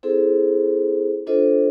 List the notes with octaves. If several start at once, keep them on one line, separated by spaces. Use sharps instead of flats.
C4 E4 G#4 A4 C5
D4 F4 A4 C5 D#5